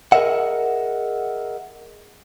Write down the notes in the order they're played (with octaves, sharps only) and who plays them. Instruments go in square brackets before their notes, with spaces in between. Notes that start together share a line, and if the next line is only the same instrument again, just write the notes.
[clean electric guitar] G#4 A#4 C5 D#5 E5 F#5